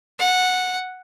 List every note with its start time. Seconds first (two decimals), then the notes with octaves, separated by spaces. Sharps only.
0.19 F#5